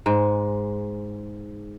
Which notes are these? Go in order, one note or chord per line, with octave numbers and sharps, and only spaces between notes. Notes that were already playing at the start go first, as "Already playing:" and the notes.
G#2 G#3